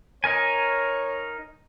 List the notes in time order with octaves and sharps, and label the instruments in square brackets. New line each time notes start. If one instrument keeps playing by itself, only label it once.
[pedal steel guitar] D#4 A#4 G#5 [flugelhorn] C#5